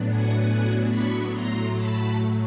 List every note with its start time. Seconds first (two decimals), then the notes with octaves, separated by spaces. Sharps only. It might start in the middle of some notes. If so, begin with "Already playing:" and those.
Already playing: A2 F#3 B3 D4
0.09 F#5 G#5
0.39 F#5 G#5
0.84 B5 C#6
1.30 A2 F#3 A3 A#5 C6
1.75 A5 B5